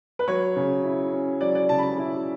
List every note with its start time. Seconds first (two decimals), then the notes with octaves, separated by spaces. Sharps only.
0.19 B4
0.28 F#3 C#5
0.56 C#3
0.84 E4
1.12 C#4
1.41 F#3 D5
1.55 D5
1.69 C#3 A5
1.78 B5
1.83 A5
1.98 E4